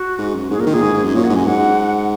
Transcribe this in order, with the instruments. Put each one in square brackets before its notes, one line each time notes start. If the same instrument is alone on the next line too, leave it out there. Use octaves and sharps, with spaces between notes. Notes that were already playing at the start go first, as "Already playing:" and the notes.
Already playing: [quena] F#4
[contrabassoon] G#2
F#2
[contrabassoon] G#2 [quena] G#4
[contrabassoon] A#2 [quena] A#4
[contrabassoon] D#3
[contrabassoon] A#2 [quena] G#4
[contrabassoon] G#2
G#2
F#2
[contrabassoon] A#2 [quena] C#5
[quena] F#5
[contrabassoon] G#2
[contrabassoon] F#2 [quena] G#5
[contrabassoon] G#2 [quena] F#5